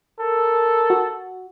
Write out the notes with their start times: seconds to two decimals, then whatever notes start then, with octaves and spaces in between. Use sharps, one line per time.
0.20 A4 A#4
0.90 F#4